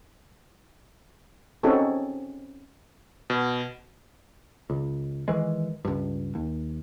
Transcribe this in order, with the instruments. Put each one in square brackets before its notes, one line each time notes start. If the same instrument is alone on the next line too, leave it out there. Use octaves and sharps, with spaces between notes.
[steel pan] C4 C#4 D#4 F#4 G#4 A4
[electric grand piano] B2
[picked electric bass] C#2
D#3 E3 G#3
C#2 G2
D#2